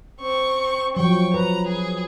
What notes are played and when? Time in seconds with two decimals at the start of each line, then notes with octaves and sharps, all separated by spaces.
0.21 C4 C#6
0.96 F3 F#3 G5 C#6
1.34 B4 A#5
1.67 G#4